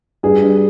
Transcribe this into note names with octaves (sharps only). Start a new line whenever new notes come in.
G2 G#4
G2